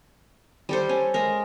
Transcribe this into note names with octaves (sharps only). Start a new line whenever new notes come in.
G3 A4 C5
C#4
G#3 A#4